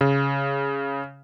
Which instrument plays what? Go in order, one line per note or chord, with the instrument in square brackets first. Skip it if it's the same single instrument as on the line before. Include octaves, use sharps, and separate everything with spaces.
[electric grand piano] C#3